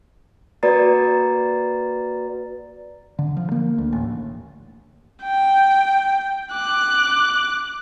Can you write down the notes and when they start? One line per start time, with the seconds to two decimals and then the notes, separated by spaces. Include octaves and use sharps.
0.63 A#3 F#4 B4 D5 A#5 A6
3.19 D3
3.37 F3
3.52 A#3
3.78 D2
3.93 A1
5.23 G5
6.53 D6 F#6